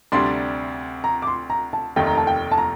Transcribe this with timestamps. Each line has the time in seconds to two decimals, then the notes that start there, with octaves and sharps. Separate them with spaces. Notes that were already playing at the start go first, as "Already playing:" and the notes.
0.12 D2 C3 G3 D4 C6
1.04 A#5
1.22 D6
1.27 C6
1.50 A#5
1.73 A5
1.96 F1 D#2 D#3 A3 G5
2.07 A#5
2.17 A5
2.27 G5
2.51 A5
2.58 A#5